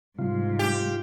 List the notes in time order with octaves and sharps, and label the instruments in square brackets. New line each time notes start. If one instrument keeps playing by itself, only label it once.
[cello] G#2 [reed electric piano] C3 G3 [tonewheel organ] F4
[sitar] G4